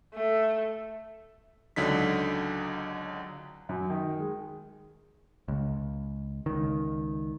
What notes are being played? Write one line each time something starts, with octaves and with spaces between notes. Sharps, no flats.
A3
C#2 D3 F#3 D#4 B6
F#2
D#3
G#3
C#2
C#2 D#3